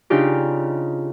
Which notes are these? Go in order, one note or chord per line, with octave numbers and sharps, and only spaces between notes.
C#3 D4 D#4 F4 G4